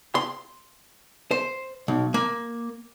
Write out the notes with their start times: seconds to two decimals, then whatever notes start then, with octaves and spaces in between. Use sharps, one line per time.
0.15 C6
1.31 C5
1.88 B1
2.14 A#3